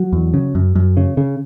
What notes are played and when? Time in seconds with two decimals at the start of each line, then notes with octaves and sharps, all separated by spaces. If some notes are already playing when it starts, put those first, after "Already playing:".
Already playing: F#3
0.13 E2
0.34 C#3
0.55 F#2
0.75 F#2
0.97 C#3
1.17 C#3